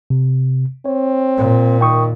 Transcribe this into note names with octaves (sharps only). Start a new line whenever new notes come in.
C3
C4 C#5
A#2
D#3 G5 C#6 D#6